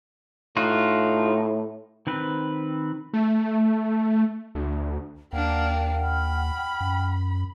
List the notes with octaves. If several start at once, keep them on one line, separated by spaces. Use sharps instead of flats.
A2 D#4 F4 F#4
D#3 C4 B4
A3
D2
D#2 A#3 D4 F#5 G5 F6
B5
F#2